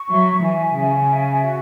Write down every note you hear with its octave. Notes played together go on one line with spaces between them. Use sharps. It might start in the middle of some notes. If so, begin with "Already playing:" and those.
Already playing: C#6
F#3 E5
E3 G#5
C#3 G#5
E5
F#4